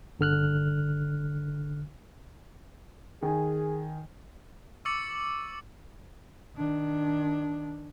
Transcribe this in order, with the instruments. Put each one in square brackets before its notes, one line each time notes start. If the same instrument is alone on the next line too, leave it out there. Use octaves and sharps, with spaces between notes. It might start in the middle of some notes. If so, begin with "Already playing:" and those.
[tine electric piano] G1 D3 F6 F#6
[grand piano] D#3 G#5 [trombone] G#4
[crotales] C#6 D6 E6 A6 C#7 F#7
[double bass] D#3 D4